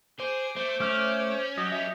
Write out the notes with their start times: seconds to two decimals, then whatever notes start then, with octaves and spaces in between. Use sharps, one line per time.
0.20 G#4 C5 D6
0.57 A3 C5
0.80 A3 C#4 F6
1.58 F#3 G4 D#5
1.72 F#3 E5